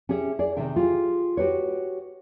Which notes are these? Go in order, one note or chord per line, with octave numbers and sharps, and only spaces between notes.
C#4 G4 G#4 E5
G#4 D5
C3 D#3 G#3 E5 G5
F4 G4 G#4
F#4 G4 B4 C#5